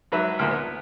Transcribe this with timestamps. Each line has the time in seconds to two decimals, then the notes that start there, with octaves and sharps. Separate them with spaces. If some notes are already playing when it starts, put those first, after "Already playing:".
0.12 G#2 F#3 B4 E5
0.39 D2 A#2
0.51 B3